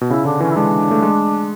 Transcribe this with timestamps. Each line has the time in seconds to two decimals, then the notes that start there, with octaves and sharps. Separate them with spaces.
0.01 B2
0.10 C#3 E4
0.25 D3 D4
0.40 E3 C#4
0.51 E4
0.56 G#3 D4
0.91 A3
1.02 G#3